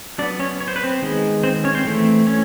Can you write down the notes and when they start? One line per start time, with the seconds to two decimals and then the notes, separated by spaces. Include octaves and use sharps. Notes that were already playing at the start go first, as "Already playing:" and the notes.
0.18 F#3 D4 D5
0.22 B3
0.40 C#4 C#5
0.60 C#5
0.68 C5
0.76 B4
0.83 C4 C5
1.02 D#3 G#3 B3
1.43 C4 C5
1.64 C#4 C#5
1.74 C4 C5
1.85 E3 A3 C4
2.27 C#4 C#5